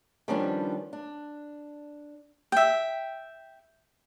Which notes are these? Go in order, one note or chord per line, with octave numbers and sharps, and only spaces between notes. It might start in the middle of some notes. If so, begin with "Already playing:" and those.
D#3 F3 G3 B3 C#4 D4
D4
E5 G5